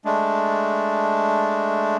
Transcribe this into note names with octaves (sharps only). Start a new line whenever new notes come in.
G#3 A3 D4